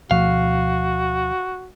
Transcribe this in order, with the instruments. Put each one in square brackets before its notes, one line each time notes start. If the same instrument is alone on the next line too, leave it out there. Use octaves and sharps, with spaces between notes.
[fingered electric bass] D2 B2 F3 [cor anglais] F#4 [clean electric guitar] F5